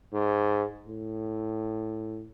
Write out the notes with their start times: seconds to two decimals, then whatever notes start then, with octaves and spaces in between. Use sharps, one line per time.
0.13 G#2
0.87 A2